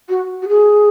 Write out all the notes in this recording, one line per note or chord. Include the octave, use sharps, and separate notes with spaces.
F#4
F#4
G#4